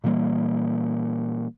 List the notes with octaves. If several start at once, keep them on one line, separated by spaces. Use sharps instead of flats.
A#2 E3 G3 A#3